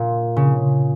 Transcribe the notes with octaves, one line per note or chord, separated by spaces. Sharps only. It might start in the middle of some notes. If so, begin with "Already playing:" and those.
Already playing: A#2
C#3